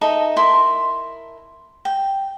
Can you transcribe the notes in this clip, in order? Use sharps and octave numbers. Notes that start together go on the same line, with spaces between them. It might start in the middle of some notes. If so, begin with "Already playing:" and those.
D#4 A4 D#5 E5
E4 A#4 C6
G5